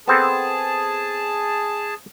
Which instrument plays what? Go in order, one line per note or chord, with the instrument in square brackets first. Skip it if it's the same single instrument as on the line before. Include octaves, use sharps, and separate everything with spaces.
[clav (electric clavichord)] B3 C4 A4 [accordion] G#4 A5